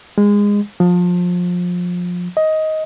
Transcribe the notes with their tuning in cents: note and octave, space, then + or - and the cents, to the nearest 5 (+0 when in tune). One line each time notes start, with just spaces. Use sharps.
G#3 -20
F3 +25
D#5 +15